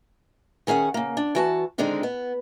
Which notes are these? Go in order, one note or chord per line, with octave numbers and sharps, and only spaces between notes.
D#3 C#4 G#4 F5 F#5
C#3 A#3
D4
E3 F#4 A5
D3 D#3 G#3 C4 D4 D#4
B3